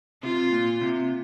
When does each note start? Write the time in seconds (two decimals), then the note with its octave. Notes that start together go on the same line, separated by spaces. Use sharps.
0.23 C3 F4
0.52 A#2
0.81 C3